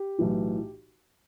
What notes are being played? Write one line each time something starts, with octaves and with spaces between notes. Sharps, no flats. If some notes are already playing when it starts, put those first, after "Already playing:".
Already playing: G4
B1 A2 E3